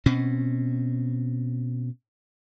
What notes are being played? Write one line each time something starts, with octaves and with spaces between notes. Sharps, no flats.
B2 C4 C#4